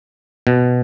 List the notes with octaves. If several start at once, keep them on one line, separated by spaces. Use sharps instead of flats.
B2